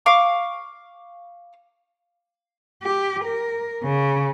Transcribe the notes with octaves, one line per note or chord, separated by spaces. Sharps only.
F5 C#6 D6
G4
A#4
C#3